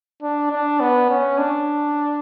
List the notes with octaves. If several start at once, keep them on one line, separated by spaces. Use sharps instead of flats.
D4
D4
B3
C#4
D4